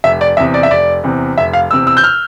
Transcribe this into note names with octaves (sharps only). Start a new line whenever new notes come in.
F1 E5
D5
E2 C3 E5
D5
E5
F1 D5
E2 C3
F1 E5
F5
E2 C3 E6
E6
G6
F6